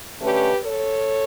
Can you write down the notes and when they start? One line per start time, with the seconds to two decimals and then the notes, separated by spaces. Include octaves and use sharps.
0.21 D3 A3 C#4 G4 B4
0.63 A4 C#5